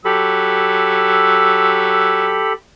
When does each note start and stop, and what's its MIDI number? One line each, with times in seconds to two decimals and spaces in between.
0.05 2.45 54
0.05 2.53 67
0.05 2.53 69
0.05 2.53 83
0.05 2.45 88